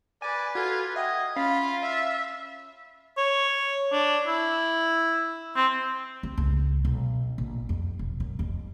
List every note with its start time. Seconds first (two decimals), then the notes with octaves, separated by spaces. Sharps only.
0.22 B4 D5 G#5
0.55 F4 F#4 A4 G#6
0.96 D#5 E5 F#5 G5
1.36 C#4 F4 F5 B5
1.82 E5
3.17 C#5
3.92 D4
4.27 E4
5.56 C4
6.23 C4
6.38 C#2
6.85 B1
7.38 A#1
7.69 F2
7.99 E1
8.20 F#2
8.39 F2